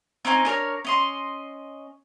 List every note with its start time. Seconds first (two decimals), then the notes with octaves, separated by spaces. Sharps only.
0.25 C4 C#4 D#4 G#5
0.45 D4 A#4 C#5 F6
0.85 C#4 D#5 C6